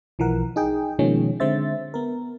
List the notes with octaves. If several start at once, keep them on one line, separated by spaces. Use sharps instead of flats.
B1 E3 F3 A#4 F#5
D#4 G#4 G5
B2 D#3 F3 G#3 A#3 C#4
D3 G#3 C4 C5 E5 A6
B3 A#4